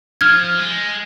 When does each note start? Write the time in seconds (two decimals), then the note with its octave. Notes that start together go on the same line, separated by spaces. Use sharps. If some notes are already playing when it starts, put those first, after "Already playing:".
0.21 F3 F6 G#6
0.59 G#3